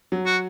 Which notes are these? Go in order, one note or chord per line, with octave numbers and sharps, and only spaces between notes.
F#3
F#4